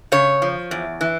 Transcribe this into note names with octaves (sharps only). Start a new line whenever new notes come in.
C#3 C#5
F3
E2
E3